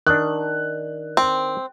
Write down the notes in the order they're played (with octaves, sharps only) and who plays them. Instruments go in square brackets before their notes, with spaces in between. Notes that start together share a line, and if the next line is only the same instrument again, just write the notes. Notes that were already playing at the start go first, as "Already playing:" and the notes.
[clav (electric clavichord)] D#3 D4 [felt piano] F#6
[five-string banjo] C4